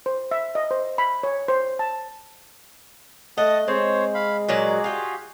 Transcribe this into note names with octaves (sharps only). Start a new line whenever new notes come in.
C5
E5
D#5
C5
B5
C#5
C5
A5
A3 D#5 F#5 A5 D#6
G#3 C4 C5 C#5
F5 B5
A#2 F#3 F#4 G#4 D5
F4 G4